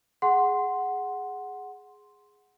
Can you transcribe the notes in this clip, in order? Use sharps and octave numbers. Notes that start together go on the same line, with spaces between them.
G#4 F#5 C6